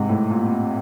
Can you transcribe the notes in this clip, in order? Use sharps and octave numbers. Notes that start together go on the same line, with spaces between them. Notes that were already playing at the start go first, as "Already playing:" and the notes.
Already playing: G#2 C3
A2
A#2